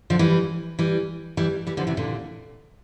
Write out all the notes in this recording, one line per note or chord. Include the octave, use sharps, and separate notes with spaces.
D3 F3
E3 G3
E3 G3
E3 G3
E3 G3
D3 F3
C3 E3
A#2 D3